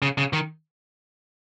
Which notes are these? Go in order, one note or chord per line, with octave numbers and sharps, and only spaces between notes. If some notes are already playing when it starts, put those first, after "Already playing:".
C#3
C#3
D#3